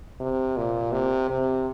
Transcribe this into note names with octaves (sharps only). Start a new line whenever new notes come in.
C3
A#2
C3
C3